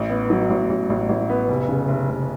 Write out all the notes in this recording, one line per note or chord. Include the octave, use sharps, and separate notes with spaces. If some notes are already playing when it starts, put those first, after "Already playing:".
Already playing: A1
B3
F#3
A1
A1
A1
A1
B3
F1
C#3
F1
F1